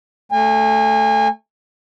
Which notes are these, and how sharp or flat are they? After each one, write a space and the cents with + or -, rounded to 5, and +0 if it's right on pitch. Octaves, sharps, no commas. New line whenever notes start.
A3 +0 G#5 -35